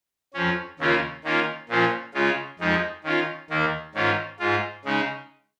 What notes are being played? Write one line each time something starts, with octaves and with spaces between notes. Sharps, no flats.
F2 F3 C#4
D#2 C#3 A#3 C#4 F4
D#3 A#3 C#4 F4
A#2 F3 C#4 F4
C#3 G#3 F4
F2 F3 G#3 D#4
D#3 C#4 F4
D#2 D#3 A#3
G#2 D#3 C#4 F4
G#2 G#3 F4
C#3 G#3 D#4